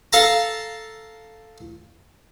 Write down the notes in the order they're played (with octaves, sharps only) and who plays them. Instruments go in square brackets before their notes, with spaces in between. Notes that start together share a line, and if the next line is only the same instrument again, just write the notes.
[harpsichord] A4 F5 A5 A#5